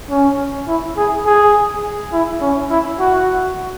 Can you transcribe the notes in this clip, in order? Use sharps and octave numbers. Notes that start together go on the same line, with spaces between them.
C#4
E4
G#4
G#4
E4
C#4
E4
F#4